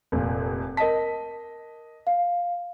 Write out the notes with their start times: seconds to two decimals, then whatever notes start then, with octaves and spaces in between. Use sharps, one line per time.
0.12 F1 A#2
0.77 A#4 D#5 A5 B6
2.07 F5